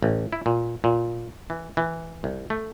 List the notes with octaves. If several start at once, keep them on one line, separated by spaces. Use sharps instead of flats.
A1
E4
A#2
A#2
E3
E3
C2
A3